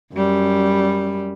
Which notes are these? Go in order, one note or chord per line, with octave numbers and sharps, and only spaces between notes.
F#2 G3